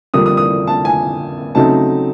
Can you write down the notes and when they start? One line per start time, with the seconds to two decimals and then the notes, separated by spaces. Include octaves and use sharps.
0.14 F2 D3 G3 A#3 D4 D#6
0.26 D#6
0.37 D#6
0.67 A5
0.85 G#5
1.55 C#3 F#3 A3 C4 D#4 A5